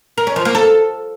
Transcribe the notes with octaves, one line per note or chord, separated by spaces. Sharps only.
A#4
C#4
F3
A#3
A4